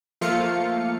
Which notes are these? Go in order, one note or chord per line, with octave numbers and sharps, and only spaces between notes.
F3 A3 A#3 F4 F5 C#7